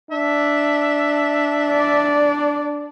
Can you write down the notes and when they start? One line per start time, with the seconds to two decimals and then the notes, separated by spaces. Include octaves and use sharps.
0.11 D4 E5
1.70 D5